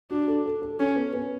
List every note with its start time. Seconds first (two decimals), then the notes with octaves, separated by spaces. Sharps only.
0.11 D4 F#4
0.28 A4
0.46 A4
0.62 A4
0.79 C#4 A4
0.96 B3
1.13 B3